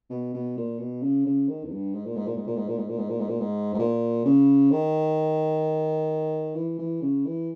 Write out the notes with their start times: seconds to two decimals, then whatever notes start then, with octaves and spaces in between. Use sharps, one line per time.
0.10 B2
0.34 B2
0.57 A#2
0.79 B2
1.03 C#3
1.26 C#3
1.49 D#3
1.64 E2
1.72 G2
1.94 G#2
2.05 A#2
2.16 G#2
2.27 A#2
2.36 G#2
2.47 A#2
2.56 G#2
2.68 A#2
2.78 G#2
2.89 A#2
2.98 G#2
3.09 A#2
3.19 G#2
3.29 A#2
3.40 G#2
3.74 G#2
3.79 A#2
4.25 C#3
4.72 D#3
6.55 E3
6.79 E3
7.02 C#3
7.25 E3